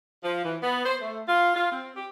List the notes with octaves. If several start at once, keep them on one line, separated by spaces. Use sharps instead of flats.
F3
E3
B3
C5
A3
F4
F4
C4
G4